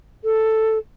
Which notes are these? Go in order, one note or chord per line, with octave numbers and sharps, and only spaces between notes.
A4